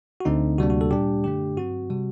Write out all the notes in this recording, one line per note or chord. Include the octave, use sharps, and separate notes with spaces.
F#4
D2 D3 A3 C4 D#4
D2 C3 G3 A#3 D4 F#4
F#4
A4
A#2 G3 D4 G4
F#2 D3 A3 D4 G4
G2 F#3 C4 F#4
C3 G3